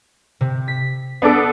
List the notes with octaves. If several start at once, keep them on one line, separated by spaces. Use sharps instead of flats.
C3
B6
B3 D4 A4 F#5 D6